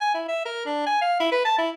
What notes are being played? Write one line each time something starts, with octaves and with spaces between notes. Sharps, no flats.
G#5
E4
E5
A#4
D4
G#5
F5
E4
B4
A5
E4